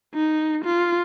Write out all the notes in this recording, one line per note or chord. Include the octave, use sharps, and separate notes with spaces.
D#4
F4